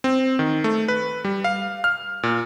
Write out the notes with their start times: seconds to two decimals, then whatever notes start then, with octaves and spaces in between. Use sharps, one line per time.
0.04 C4
0.39 D#3
0.64 A3
0.88 B4
1.25 G3
1.44 F5
1.84 F6
2.23 A#2